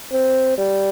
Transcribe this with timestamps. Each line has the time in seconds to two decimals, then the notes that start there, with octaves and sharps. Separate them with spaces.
0.12 C4
0.58 G3